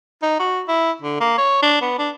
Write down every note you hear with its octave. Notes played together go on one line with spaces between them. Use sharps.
D#4
F#4
E4
D3
A#3
C#5
D4
B3
D4